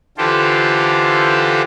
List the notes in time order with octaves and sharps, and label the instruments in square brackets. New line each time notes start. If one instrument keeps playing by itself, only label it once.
[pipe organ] D3 E3 F4 G4 A4 C5